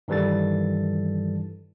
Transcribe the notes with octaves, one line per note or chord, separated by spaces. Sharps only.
G2 D#3 E3 G3 A4 A6